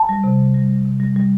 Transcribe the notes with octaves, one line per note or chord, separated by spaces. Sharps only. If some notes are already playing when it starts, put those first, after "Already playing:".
Already playing: A5
G3
C3
G3
G3
G3
C3
G3
G3